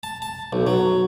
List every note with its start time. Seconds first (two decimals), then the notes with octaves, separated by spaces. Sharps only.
0.03 A5
0.22 A5
0.53 B1
0.67 F#3